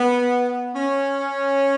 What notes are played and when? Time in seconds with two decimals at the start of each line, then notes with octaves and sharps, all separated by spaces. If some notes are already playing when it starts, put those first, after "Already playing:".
Already playing: B3
0.76 C#4